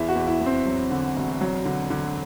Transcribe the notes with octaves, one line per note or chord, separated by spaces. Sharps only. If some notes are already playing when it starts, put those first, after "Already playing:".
Already playing: E2 E4
F#4
E2
E4
E2
C4
F#3
D3
E1
F#3
D3
D3